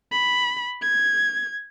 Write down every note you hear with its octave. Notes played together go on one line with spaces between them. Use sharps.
B5
G#6